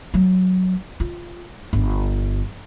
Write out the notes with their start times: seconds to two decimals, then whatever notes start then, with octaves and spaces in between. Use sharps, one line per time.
0.14 F#3
1.00 F4
1.73 G1